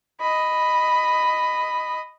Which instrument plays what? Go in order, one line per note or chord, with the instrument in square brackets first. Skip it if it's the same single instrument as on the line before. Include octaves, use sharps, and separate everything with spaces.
[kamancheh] D#5 B5